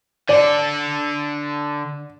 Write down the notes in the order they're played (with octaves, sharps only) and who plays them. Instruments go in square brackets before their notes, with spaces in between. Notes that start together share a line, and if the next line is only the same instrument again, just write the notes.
[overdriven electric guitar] D3 A4 [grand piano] D5